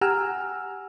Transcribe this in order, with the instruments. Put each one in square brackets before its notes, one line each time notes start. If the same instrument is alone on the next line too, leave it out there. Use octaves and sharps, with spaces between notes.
[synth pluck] G4 F#5 G#5 A#5 E6 F6